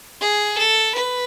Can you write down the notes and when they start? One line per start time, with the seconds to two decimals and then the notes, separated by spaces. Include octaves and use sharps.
0.21 G#4
0.58 A4
0.95 B4